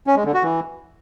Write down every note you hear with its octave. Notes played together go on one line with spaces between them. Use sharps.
C#4
G#3
D3
F#4
E3